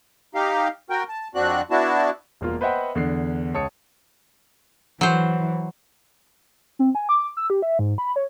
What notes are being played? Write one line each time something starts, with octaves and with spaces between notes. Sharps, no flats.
D#4 G4 F5
F#4 A#4 G5
A5
F2 C4 D4 F#4 F#6
B3 D4 E4 F#4 A5
E1 A#3 F4
B4 C5 D#5 E5 F#5 G5
E2 D3 C7
C#2 C#5 A5 D#6 C#7
E3 F#3 C5
C4
G#5
D6
E6
G4
E5
G#2
B5
C#5